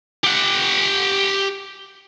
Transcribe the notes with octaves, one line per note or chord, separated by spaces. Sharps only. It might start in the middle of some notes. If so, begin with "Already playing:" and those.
G4 F#5